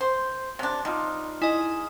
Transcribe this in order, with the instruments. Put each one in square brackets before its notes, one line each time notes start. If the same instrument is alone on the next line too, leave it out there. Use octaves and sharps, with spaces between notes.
[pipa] C5
C3 D4
[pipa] G3 [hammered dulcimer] D#4 F4
[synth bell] E4 D#5 [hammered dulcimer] G#4